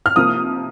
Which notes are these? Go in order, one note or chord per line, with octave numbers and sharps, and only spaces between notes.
F6
C3 F3 A#3 D#6